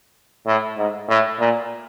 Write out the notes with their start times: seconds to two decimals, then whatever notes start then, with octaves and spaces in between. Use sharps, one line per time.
0.47 A2
0.77 G#2
1.09 A2
1.40 A#2